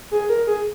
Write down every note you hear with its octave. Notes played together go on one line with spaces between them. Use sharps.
G#4
A#4
G#4